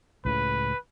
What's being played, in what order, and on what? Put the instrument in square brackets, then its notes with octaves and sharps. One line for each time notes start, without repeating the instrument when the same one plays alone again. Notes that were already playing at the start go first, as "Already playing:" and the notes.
[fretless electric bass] C#2 A2 C#3 [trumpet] B4